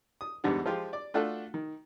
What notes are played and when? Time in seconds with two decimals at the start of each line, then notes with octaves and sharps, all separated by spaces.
0.21 D#6
0.44 E2 G#2 D3 G3 B3
0.66 F3 G#3 F4 G4
0.93 D5 D6
1.14 A3 D4 F4 F#4 A4
1.54 D#3